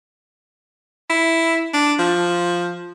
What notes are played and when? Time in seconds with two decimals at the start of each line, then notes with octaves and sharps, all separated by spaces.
1.10 E4
1.73 D4
1.99 F3